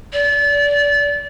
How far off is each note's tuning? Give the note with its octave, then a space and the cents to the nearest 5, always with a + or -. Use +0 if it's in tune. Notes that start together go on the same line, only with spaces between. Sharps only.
D5 -30